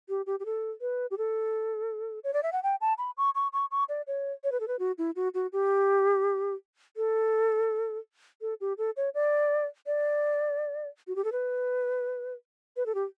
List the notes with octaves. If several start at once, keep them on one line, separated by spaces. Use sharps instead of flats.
G4
G4
G4
A4
B4
G4
A4
C#5
D5
E5
F#5
G5
A5
B5
C#6
C#6
C#6
C#6
D5
C#5
C#5
B4
A4
B4
F#4
E4
F#4
F#4
G4
A4
A4
G4
A4
C#5
D5
D5
F#4
G4
A4
B4
B4
A4
G4